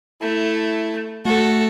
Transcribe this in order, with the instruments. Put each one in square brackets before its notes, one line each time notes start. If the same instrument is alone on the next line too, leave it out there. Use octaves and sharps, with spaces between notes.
[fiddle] A3 [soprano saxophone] E4
[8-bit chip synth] A3 [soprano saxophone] F#4 [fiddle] A4